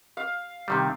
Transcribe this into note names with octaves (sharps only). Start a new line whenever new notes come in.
F5
C3 D#3 G3